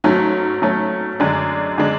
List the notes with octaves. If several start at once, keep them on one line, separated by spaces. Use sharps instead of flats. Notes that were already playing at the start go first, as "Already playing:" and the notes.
G#2 F#3 A3 C#4
G#2 F#3 A3 C#4
F#2 D3 G#3 D4
D3 G#3 D4